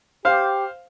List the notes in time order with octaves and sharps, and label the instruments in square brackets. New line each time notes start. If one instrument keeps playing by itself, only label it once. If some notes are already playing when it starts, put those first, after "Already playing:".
[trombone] G4 [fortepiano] C5 F5